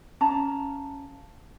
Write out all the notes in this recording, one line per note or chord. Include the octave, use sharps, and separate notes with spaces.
C#4 F5 A5 A#5